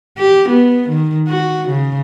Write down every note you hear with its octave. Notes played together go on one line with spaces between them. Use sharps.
G4
B3
D#3
F#4
C#3